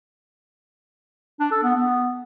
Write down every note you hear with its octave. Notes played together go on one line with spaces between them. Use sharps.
D4
A4
B3
B3